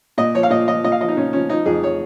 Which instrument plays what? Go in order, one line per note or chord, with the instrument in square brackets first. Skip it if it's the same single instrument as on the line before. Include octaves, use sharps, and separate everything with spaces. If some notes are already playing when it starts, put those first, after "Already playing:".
[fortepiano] A#2 D#5
F3 C#5
F5
A#2 D#5
F3 D#5
A#2 D#5
F5
F3 D#5
D#4
A#2 C#4
F3 C#4
F3 D#4
F2 G#4
C#5